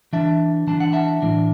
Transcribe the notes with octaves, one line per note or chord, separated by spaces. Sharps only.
E3 D4 E5 A5
E3 D4 A5
F#5
E5 A5
A2 E3 D4